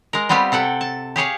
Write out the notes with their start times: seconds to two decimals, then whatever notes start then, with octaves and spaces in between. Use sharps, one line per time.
0.13 G#3 A#4
0.29 G3 B3 C4 F4 G4
0.52 C3 A4 F#5 G5
0.81 A5
1.16 G4 G#4 C#5 F5